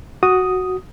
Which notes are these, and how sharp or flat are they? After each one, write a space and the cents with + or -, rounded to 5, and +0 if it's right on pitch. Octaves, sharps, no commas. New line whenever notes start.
F#4 +0 D#6 +0